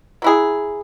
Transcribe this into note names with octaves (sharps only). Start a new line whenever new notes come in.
F#3 E4 G#4